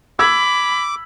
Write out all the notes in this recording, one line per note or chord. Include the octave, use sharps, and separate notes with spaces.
B5 D6 E6 G#6